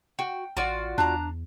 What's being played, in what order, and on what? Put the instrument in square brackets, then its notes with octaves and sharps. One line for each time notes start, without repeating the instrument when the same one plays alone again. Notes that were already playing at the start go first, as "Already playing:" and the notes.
[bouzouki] F#4 [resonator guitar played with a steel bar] G5
[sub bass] A1 [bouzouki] F4 F#4 D5
[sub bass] E2 [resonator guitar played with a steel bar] D4 A5 A#5